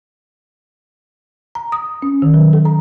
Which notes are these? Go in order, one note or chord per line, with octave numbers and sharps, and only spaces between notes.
A#5
D#6
C#4
D#3
F#3
A4
A#5